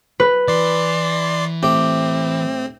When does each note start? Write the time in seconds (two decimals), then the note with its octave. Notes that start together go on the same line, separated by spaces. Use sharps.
0.20 B4
0.48 E3 D5 C6
1.63 A2 C4 G4